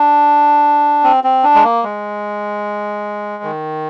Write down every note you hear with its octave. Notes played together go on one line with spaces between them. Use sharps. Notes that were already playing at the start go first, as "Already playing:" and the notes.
Already playing: D4
C4
C4
D4
G#3
A#3
G#3
D#3